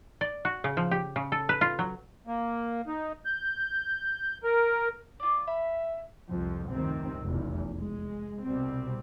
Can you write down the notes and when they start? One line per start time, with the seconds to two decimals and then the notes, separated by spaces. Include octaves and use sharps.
0.21 D5
0.45 F#4
0.64 C#3
0.77 F3
0.91 G4
1.16 C#3
1.32 A4
1.49 B4
1.61 F4
1.79 F#3
2.27 A#3
2.87 D#4
3.25 G6
4.44 A#4
5.20 F4 D5
5.47 E5 B5
6.29 C2 F2 F3
6.68 F1 C#2 G2 C3 D#3 C4
7.23 F1 B1 E2
7.78 G#3
8.43 C2 B2 G3 C4